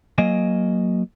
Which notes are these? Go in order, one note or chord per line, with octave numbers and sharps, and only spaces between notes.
F#3 A#3 D#5 G#5